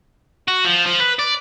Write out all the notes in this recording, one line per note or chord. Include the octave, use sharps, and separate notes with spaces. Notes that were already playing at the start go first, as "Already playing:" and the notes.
F#4
F3
F3
B4
D5